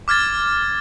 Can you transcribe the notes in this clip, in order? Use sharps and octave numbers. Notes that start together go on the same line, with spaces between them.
D6 F6 G#6 A6